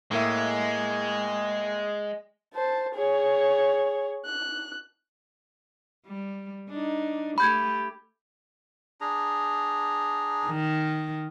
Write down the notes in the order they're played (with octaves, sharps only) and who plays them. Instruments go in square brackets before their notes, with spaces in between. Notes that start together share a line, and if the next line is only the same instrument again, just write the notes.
[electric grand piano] A2 A#3 E5 [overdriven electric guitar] G#3
[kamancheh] C5 A5
G#4 C#5
F#6
[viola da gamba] G3
D4 D#4
[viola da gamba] A3 G4 [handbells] B5 G6 G#6
[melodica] D4 G#4 A#5
[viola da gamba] D#3